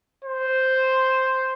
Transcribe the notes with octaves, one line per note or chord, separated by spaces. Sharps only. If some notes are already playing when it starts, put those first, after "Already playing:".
C5